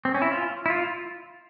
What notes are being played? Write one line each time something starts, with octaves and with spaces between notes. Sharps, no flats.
C4
C#4
E4
F4
E4
F4